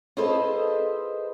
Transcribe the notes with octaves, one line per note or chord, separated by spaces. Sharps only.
F4 G#4 A4 B4 C5 D#5